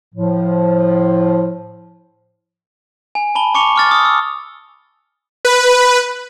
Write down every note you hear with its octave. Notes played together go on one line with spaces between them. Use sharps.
A2 F3
G#5
A5 B5 G7
A5 C#6 D6 C#7 F7 G7
D6 F6 A6
D#6 F6
E6
B4